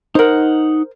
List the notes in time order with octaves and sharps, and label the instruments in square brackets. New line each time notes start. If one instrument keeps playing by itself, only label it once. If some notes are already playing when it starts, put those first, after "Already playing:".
[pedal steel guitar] D#4 F#5 [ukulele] A#4 C5